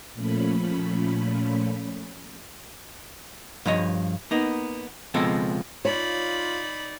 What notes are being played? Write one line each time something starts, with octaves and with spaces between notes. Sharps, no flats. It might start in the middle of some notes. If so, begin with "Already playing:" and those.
A#2 F3 A3 C#4 B5
G2 F3 C#5 D#5
A#3 B3 D#4
C#2 B2 F3 G#3 C4 A4
D#4 F4 C#5 D5 B5